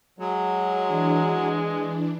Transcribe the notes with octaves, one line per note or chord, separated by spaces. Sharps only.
F#3 G#3
E3 D4